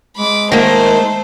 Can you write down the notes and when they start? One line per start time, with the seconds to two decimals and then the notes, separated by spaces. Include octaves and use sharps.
0.17 G#3 B5 D6
0.52 D#3 A3 A#3 C5